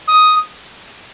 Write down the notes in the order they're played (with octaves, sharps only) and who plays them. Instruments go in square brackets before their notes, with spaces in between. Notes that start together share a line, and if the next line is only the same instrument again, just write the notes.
[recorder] D#6